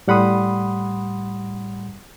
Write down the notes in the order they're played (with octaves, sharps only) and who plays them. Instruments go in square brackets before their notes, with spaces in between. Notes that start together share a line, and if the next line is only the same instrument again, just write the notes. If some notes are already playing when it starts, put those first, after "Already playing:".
[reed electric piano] A2 G3 F#5 B5 C6 D#6